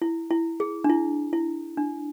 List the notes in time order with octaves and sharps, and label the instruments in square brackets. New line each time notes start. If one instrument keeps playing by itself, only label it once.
[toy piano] E4
E4
G#4
D4
E4
E4
D4